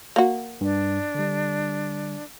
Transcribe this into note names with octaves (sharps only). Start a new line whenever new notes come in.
A#3 F#4
G2 D4
D3 G3